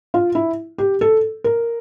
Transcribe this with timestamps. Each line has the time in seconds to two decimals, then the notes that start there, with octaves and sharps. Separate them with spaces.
0.14 F4
0.35 E4
0.78 G4
1.01 A4
1.44 A#4